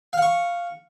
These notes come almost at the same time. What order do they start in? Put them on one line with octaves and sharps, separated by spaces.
F5 F#5 C#6